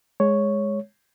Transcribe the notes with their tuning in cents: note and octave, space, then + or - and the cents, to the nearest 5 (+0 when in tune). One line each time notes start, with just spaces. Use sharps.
G#3 +0 C#5 +0